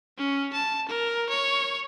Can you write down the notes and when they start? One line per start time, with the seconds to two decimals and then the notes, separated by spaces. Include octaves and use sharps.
0.18 C#4
0.53 A5
0.89 A#4
1.29 C#5